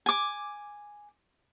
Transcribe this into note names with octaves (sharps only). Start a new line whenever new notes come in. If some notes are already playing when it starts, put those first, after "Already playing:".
G#5 D6